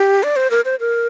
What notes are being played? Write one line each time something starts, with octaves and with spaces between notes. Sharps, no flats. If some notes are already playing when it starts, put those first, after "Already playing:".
Already playing: G4
D5
C5
A#4
C5
A#4